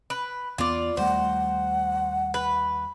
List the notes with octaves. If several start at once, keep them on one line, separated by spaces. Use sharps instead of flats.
B4
E2 B3 F4 D5
D#2 G3 A3 C5 F#5
B4